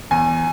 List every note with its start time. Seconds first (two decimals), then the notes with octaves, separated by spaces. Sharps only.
0.11 E2 G#5